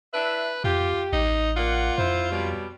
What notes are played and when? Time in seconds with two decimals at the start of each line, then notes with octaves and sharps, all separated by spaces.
0.14 D4 E4 B4 E5
0.64 F2 F4 G4
1.13 A1 D#4
1.57 A#3 F4 D5 F#5
1.98 F2 E4 C5
2.31 B2 F#3 G3